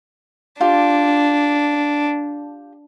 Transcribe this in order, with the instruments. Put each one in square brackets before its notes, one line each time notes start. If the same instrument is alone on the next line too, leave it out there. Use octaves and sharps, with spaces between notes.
[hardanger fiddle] D4 [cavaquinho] F4 G4